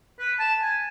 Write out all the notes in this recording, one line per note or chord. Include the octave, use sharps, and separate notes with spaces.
B4
A5
G#5